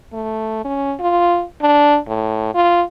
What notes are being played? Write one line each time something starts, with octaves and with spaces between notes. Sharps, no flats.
A3
C#4
F4
D4
A2
F4